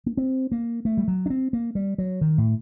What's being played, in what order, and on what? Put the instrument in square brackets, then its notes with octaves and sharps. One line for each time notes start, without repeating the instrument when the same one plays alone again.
[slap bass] A#3
C4
A#3
A3
G3
F#3
D4
C4
A#3
G3
F#3
D#3
A2